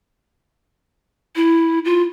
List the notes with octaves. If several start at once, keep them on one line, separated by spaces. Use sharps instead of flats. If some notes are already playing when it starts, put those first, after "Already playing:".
E4
F4